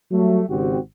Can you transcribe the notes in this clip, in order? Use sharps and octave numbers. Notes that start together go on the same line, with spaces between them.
F#3 G3 A3
G#1 C#3 C4 F#4 G4